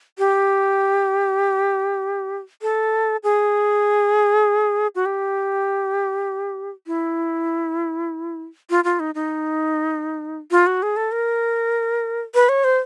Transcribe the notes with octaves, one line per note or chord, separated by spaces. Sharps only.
G4
A4
G#4
F#4
G4
E4
F4
F4
D#4
D#4
F4
F#4
G#4
A4
A#4
B4
C#5
C5